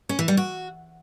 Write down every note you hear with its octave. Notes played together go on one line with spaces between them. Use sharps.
C#4
E3
G3
F#4